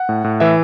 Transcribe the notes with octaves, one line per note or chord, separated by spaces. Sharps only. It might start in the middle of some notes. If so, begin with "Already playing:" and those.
Already playing: F#5
A2
A2
E3 E5